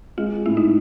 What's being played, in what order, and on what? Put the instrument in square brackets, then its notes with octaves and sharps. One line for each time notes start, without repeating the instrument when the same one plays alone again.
[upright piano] G#3 [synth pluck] F4
[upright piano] A2 [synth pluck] E4
[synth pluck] D#4